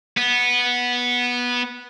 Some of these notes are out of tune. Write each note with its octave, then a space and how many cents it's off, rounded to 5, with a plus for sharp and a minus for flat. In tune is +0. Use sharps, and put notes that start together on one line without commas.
B3 -10